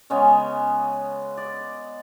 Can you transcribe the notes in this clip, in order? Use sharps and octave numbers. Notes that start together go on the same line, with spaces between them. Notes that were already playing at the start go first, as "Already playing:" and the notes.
C#3 G#3 B3 C#4
D5